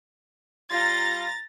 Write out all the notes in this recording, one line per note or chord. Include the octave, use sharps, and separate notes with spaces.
G3 F4 A#5 A6 A#6